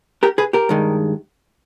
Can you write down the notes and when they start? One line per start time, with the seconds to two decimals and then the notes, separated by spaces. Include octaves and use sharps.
0.23 G4 A#4
0.38 G#4 B4
0.53 G4 A#4
0.69 G2 D#3 G#3